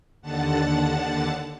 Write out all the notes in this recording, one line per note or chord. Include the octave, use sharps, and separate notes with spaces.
D#2 D3 F#5 A5 A6